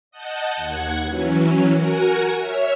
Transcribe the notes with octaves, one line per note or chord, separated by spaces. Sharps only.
D#5 F#5 A5 G6
D#2 F#5 G#6
E3 F#3 C#4
F#4 A#4 F#5 G#5
C#5 E5 F6